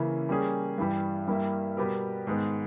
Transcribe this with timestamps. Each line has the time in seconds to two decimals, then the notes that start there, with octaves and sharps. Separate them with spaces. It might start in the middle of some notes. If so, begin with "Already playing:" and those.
Already playing: C#3 E3 A#3 C#4 E4
0.29 G3 A#3 C#4 G#4
0.78 G2 E3 G3
1.27 G2 G3 A#3 E4
1.77 B2 G3 B3 G4 A#4
2.27 G#2 D#3 G#3 B3